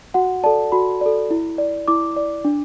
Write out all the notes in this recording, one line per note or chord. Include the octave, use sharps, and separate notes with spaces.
F#4 F#5
A4 D5 A5
F#4 B5
A4 D5
E4
D5
E4 D6
D5
D4